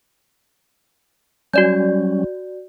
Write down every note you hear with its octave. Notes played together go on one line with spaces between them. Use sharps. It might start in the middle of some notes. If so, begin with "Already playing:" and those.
F#3 G3 C#4 F#4 D5 G6